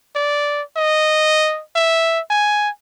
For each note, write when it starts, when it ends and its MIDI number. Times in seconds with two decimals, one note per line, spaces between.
0.16 0.62 74
0.77 1.62 75
1.76 2.21 76
2.30 2.70 80